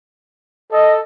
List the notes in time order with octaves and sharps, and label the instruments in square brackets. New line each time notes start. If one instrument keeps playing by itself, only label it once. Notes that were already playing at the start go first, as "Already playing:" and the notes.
[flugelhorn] A4 [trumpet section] D#5